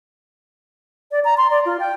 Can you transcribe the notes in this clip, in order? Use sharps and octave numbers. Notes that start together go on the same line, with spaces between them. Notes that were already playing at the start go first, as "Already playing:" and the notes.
D5
A#5
C6
D5
F4
G5